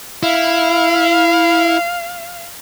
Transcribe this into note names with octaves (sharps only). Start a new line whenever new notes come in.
E4 F5